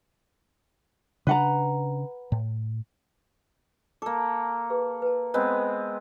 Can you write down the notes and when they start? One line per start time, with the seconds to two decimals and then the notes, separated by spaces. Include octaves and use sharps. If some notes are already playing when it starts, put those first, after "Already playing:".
1.27 C#3 D4 B4 F#5 A#5
2.32 A2
4.02 A#3 A4 D6
4.70 G#4 B4
5.02 B4 A5
5.34 G#3 B3 C4